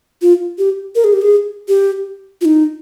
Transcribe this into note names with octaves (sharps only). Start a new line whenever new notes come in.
F4
G4
A#4
G#4
G4
G#4
G4
F4
D#4